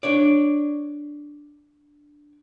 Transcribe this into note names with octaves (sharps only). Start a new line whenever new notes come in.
D4 C#5 D5